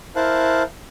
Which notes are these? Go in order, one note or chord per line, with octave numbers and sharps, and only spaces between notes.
E4 A#4 C5 F5 A5 F#6